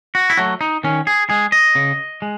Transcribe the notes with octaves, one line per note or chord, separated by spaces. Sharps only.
F#4
E4
F#3 A3 F#4
D#4
D#3 C#4
G#4
G#3 G#4
D#5
C#3
G#3